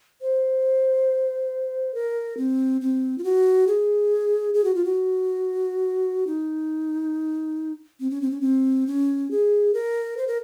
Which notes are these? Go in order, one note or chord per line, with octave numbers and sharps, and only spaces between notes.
C5
A#4
C4
C4
F4
F#4
G#4
G#4
F#4
F4
F#4
D#4
C4
C#4
C4
C#4
C4
C#4
G#4
A#4
C5
A#4